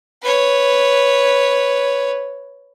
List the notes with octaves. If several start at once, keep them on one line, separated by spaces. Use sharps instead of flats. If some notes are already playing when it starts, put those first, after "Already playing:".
B4 C#5